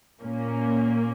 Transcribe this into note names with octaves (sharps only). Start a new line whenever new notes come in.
A#2 A#3 C#4